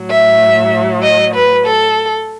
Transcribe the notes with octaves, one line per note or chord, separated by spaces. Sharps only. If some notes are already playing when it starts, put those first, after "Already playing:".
Already playing: A2 F#3
E5
D#5
B4
A4